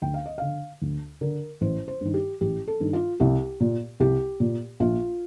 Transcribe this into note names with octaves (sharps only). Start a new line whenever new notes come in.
D2 G5
F5
D#5
D3 F5
D2
D3 A#4
A1 C5
C5
G2 D#3
G4
A1 G4
A4
G2 D#3
F4
C2 G4
A#2
C2 G4
A#2
A#1 F4